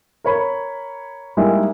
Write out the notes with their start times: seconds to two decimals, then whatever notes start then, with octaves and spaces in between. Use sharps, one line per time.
0.24 A#4 C#5 B5
1.37 G3 G#3 A#3 D#4 E4 G4